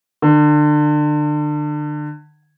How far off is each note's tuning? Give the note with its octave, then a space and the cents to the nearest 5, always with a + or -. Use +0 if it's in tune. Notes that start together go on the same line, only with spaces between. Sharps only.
D3 +30